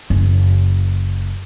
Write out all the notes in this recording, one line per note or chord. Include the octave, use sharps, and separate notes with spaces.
F#1